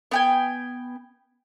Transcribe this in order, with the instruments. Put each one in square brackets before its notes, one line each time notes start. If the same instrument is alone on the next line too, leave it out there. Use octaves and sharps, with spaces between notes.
[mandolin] B3 G5 G#5